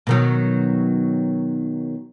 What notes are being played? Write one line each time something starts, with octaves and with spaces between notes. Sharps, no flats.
B2 D#3 F#3